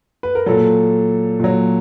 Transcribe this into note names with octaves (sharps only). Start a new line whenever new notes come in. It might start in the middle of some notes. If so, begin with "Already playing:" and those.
B4
A#4
A#2 F#3 A4
A#2 F#3